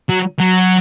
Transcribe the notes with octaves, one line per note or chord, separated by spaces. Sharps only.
F#3
F#3